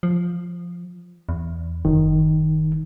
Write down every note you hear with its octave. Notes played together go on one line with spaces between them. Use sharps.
F3
E2
F#1 D#3